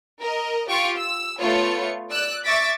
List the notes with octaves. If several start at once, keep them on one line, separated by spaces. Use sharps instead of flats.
A#4 D#5
F4 G4 C#6 D7
E6
A3 B3 F4 C#5 C#7
D5 E6 F#6
E5 C#6 D6 A6 B6 D7